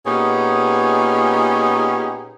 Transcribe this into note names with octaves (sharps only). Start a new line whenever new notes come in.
A#2 B3 C#4 D#4 G4 G#4